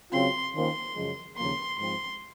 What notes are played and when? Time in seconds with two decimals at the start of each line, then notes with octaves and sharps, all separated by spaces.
0.12 C#3 F#3 C4 F4 C6
0.53 D#3 A#3 C#4 F4 C5 C6
0.95 F#2 C#3 F3 G#3
1.37 D#2 C#3 F3 A#3 C6
1.78 G#2 F3 C4 C6